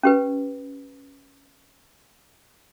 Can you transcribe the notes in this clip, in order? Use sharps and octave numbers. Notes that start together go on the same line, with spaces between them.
C#4 G4 B4